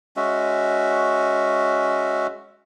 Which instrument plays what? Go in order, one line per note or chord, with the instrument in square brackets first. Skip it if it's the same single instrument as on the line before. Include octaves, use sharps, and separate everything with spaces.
[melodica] G#3 C#4 F#4 E5